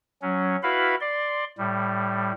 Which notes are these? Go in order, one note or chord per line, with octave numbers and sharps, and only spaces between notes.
F#3 C#4
E4 F#4 B4 F5 B5
D5 C6
A2 G3